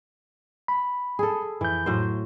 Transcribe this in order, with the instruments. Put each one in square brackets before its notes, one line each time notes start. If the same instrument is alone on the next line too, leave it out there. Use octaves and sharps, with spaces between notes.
[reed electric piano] B5
[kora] G#4 A4
[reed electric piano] F2 G6 [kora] E3
[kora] A2 F#3 C5